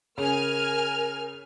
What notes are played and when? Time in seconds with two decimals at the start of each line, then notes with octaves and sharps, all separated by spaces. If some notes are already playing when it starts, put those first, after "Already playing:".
0.18 C#3 A#4 G#5 F6